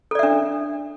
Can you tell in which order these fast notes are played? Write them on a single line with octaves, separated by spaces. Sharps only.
A4 D5 E5 D4